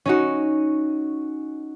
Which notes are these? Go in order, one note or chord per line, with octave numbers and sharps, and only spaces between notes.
C#4 D#4 F#4